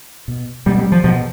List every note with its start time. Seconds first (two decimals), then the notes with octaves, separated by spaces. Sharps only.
0.28 B2
0.66 B2 G3
0.79 G3
0.92 F3
1.04 B2 F3